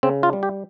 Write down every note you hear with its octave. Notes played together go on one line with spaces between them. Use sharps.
C#3 C4
F4
G3
G4